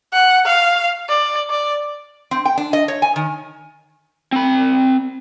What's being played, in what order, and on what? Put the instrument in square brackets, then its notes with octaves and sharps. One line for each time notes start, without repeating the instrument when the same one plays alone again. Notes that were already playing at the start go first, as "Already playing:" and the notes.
[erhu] F#5
F5
D5
D5
[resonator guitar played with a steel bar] C4
G5
D4
D#5
C#5
G#5
D#3
[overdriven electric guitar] C4 B5